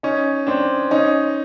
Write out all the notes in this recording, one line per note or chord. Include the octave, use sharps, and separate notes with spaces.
C#4 D#4
C4 D4
C#4 D#4